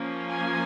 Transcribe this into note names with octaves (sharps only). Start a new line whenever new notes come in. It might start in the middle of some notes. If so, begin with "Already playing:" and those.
Already playing: F3 A#3 C#4
G#5